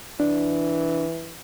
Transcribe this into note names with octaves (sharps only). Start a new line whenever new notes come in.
E3 D4